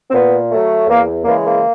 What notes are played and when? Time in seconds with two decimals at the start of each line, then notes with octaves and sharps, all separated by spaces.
0.10 C4
0.14 A#2 B3
0.50 F#3 A3
0.88 E2 A#3
1.24 C#3 E3 G#3 A#3
1.44 A#3